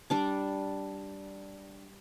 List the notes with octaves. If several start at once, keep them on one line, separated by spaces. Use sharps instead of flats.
G3 D4 D6